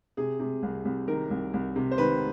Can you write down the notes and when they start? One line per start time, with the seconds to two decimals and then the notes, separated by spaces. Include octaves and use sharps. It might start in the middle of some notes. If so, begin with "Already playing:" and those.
0.17 C3 G#4
0.39 C3
0.63 C2
0.85 C2
1.07 D#3 A#4
1.31 C2
1.54 C2
1.76 C3
1.92 C5
1.98 D#3 B4